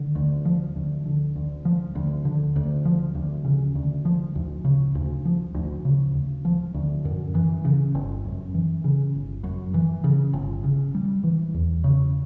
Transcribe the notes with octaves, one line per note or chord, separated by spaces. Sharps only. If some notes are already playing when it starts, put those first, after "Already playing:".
Already playing: D3
D2
F3
D2
D3
D2
F3
D2
D3
D2
F3
D2
C#3
D2
F3
D2
C#3
D2
F3
D2
C#3
D2
F3
D2
F#2
E3
C#3
G1
F#2
E3
C#3
G1
F#2
E3
C#3
G1
C#3
G3
E3
E2
C#3